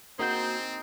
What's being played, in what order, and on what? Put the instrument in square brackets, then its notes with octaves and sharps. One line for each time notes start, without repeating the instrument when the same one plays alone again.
[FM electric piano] A#3 F#4 G6 [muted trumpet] C4 [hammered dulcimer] D#4 [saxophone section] G#4 C5